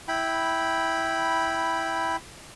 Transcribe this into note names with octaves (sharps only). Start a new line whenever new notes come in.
E4 G5 B5